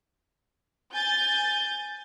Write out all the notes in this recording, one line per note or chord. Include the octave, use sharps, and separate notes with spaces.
G#5 G6 A6